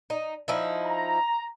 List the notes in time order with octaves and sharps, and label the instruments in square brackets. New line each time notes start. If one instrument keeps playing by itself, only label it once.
[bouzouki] D#4
F3 D#4 E4
[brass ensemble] A#5